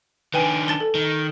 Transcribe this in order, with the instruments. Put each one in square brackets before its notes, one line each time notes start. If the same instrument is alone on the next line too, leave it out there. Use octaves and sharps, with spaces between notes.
[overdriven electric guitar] D#3 D4 [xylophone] B4 G5 G#5
[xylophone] A5 A6 G7
A4
[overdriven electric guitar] D#3